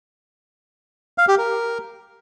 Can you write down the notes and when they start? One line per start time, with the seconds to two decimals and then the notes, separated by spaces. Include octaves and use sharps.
1.18 F5
1.28 G4
1.38 A#4